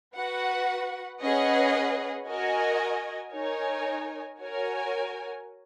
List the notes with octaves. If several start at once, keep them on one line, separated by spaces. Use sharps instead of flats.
F#4 B4 F#5
C#4 G#4 B4 D#5 F#5
F#4 A#4 D#5 G#5
D#4 A#4 C#5 G#5
F#4 A#4 C#5 G#5